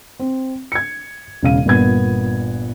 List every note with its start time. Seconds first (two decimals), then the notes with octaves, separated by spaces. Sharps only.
0.20 C4
0.72 G#6 C#7
1.42 E1 C#3 F5 D#7
1.66 G1 A#2 B3 G#6